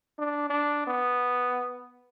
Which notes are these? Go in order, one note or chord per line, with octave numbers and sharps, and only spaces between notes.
D4
D4
B3